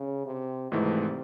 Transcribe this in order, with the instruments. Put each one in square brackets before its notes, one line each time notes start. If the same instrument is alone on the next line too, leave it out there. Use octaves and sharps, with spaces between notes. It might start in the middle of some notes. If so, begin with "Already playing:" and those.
Already playing: [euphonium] C#3
C3
[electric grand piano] G#1 G#2 E3 A3 [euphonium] C3